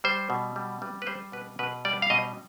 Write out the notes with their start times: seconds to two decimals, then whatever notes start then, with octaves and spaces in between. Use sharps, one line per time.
0.04 G3 C5
0.30 B2
0.56 G3
0.82 G3 B4
1.02 B4
1.07 G3 C5
1.32 B2 B4
1.59 B2 B4
1.85 G3 D5
2.02 F5
2.10 B2 D#5